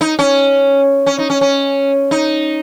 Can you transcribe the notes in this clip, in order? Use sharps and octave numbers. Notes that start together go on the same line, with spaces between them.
D#4
C#4
C#4
D#4
C#4
C#4
D#4